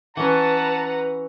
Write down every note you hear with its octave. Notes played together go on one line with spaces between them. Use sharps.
E3 C#4 B4 F#5 A5 A#5